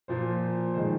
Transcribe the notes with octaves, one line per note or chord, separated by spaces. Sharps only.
A#2 F3 A#3 C5
C5
D#3 G#3